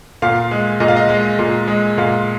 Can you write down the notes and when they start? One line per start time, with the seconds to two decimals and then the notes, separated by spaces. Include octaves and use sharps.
0.22 A#2 F5
0.51 G#3
0.80 A#2 D#5
0.88 F5
0.96 D#5
1.09 G#3
1.39 A#2
1.68 G#3
1.98 A#2 F5